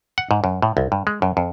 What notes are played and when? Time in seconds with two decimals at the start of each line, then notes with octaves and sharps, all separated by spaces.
0.18 F#5
0.31 G#2
0.44 F#2
0.62 A2
0.77 C2
0.92 G2
1.07 G#3
1.22 F#2
1.37 F2